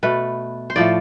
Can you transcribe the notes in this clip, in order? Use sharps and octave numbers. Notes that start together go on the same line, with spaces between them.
B2 A3 B4
C5
A2 F3 A3 D5